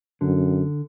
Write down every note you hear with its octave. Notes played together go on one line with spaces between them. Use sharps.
F#2 D3